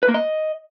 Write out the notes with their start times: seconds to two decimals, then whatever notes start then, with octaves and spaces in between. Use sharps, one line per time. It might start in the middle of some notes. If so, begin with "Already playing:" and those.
0.03 B4
0.09 A#3
0.14 D#5